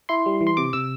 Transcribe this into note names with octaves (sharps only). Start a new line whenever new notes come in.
E4 C6
G3
E3
C6
C3 D6
C3 E6